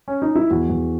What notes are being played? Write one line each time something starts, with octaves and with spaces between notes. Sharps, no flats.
C#4
D#4
E4
E2 F#4
E2